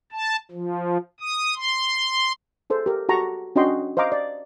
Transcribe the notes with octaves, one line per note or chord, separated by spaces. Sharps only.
A5
F3
D#6
C6
G#4 A4 C5
G4 A#4
F#4 G4 A4 A5 A#5 C#6
C#4 D4 F#4 D#5 G5 C6
C5 D#5 F5 A#5 D6
D5